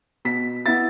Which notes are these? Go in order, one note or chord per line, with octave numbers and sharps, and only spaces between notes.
B2 B6
B3 E4 A6